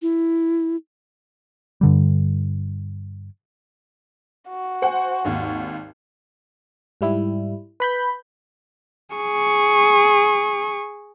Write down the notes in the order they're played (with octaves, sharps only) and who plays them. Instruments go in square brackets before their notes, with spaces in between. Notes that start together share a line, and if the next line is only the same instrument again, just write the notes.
[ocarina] E4
[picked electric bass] G2 D3 G3
[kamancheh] F#4
[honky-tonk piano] C5 F#5 G#5
G#1 D#2
[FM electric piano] G#2 G3 E4
B4 B5 G6
[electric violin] G#4 C#6